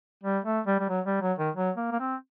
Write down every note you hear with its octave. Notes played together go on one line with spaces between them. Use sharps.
G3
A3
G3
G3
F#3
G3
F#3
D#3
F#3
A#3
A#3
C4